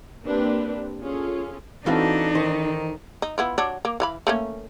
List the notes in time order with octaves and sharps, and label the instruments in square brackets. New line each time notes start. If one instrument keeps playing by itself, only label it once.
[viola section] A#3 C4 D4 G4 B4
C#4 F4 G#4 A4
[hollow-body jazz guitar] E3 C4 [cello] D4 D#4 [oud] F#4 A4 F5
[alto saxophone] D#3 [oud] C5
[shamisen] D#4
B3 E4 F4
F#3 D4
A#3
E3 F5 B5
A3 A#3 C#4